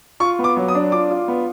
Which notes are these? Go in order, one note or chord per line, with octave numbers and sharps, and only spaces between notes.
F4 C#6
B3
D6
F#3
D#6
D4
F4 D6
F4
B3